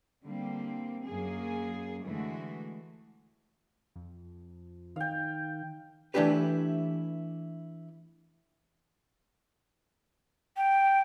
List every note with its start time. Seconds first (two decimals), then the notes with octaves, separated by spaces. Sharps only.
0.25 D3 G3 A#3 C4
1.06 F#2 F#3 A#3 G#4
2.04 D3 E3 G#3 A3 F#4
3.96 F2
4.96 D#3 F5 G5
6.14 E3 A3 D4 E4 G4 B4
10.57 G5